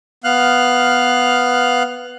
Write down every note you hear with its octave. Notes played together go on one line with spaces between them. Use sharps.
B3 F5 F6 F#6